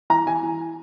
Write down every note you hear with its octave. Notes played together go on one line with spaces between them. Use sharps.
E3 A#5
E3 G#5
E3